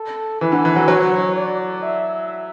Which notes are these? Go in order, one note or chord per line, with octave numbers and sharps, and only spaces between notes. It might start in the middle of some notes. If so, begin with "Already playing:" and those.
Already playing: A4
E3 B4
D3
E3
F#3
F#3 C#5
D5
E5